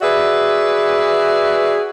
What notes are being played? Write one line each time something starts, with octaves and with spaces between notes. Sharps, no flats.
F#4 G#4 B4 D5 E5